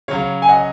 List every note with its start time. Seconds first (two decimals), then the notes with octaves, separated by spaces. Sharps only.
0.08 C#3 F#3 C#5 F5
0.42 G#5
0.49 D#5 F#5